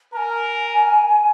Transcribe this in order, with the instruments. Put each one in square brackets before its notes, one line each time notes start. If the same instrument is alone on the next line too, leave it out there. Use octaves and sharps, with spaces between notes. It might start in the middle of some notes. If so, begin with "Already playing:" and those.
[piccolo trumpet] A#4 [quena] G#5 A#5